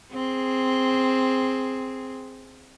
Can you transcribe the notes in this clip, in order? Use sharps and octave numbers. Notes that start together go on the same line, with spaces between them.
C4 G#4